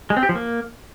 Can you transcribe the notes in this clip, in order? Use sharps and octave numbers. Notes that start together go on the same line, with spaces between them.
G#3
C4
G4
F3
A#3